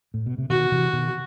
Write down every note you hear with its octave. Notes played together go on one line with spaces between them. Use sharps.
A2
B2
C3
B2 D#3 F#4
C3 E3
B2 D#3